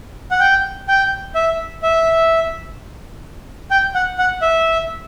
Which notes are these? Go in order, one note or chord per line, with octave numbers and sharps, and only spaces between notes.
F#5
G5
G5
E5
E5
G5
F#5
F#5
E5